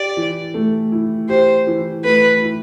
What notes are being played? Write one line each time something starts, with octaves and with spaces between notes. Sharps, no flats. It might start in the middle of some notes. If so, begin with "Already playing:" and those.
Already playing: G4 D5
E3
A3
E4
G4 C5
E3
A3 B4
E4